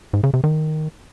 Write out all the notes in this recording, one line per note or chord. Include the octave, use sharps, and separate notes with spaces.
G#2
C#3
C3
D#3